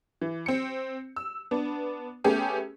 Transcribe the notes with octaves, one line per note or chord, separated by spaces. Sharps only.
E3
C4 C#7
E6
B3 D4
A3 B3 C#4 G4 G#4